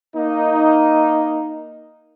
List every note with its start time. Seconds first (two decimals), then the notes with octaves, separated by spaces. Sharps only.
0.15 A#3 D#4